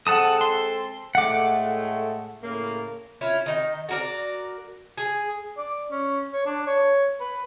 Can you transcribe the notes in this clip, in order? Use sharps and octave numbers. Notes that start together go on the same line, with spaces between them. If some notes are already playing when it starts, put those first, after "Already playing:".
G#3 C4 A4 F#5 A5 D#6
C6
A2 G#3 A3 F#5 D6
A2 C#3 A#3
C#4 E4 F4 C#5
D#3 D#4
F#4 A#4 D5
G#4
D5
C#4
C#5
D4
C#5
B4